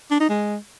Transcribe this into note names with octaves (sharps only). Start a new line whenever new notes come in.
D4
D#4
G#3